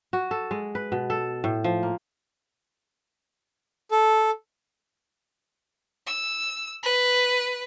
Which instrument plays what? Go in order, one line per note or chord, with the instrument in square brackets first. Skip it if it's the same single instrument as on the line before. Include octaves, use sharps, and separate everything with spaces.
[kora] F#4
A4
G#3
B4
B2
A4
A2
F3
A#3
[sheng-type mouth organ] A4
[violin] E6
B4